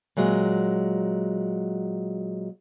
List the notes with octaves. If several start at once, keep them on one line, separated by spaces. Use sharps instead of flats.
A#2 F#3 G#3